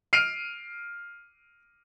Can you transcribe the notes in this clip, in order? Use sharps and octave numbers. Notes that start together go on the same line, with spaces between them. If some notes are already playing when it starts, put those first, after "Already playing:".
F6 C7 D7 D#7 F7